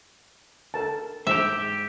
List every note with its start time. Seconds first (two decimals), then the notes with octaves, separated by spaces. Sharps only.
0.74 A4 A#4 A5
1.27 G#2 G4 E5